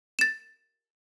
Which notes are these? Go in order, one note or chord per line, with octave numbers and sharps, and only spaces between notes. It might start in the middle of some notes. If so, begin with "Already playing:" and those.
A6 E7